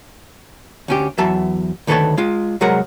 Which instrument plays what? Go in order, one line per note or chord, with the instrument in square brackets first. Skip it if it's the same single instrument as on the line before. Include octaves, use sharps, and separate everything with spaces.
[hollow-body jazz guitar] D2 C#4 G4
E2 F#3 E5 A5
D2 D#3 A4 B4 C#5 A5
G#3 F4
C2 F#3 G#3 G#4 A#4 F#5